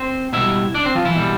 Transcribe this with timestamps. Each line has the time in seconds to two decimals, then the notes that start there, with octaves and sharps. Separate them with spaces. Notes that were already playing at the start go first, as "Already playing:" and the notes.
Already playing: C4 C5
0.33 B2 G3 E4 E5
0.74 D4 D5
0.85 C4 C5
0.95 F3 F4
1.05 E3 E4
1.16 B2 G3